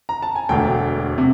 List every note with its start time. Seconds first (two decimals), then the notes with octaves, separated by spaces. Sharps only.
0.09 A#5
0.22 A5
0.36 G#5
0.49 E1 D2 D3 G5
1.18 C3